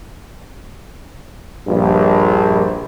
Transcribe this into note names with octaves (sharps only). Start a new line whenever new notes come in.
A#1 G2